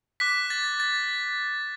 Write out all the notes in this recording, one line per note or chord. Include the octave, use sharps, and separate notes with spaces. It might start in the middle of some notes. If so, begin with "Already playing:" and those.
D6 F#6 B6
A6
A6